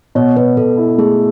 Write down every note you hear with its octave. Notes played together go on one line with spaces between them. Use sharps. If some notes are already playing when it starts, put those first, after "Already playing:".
B2 C#5
B2 B4
B2 A4
E4
A3 G#4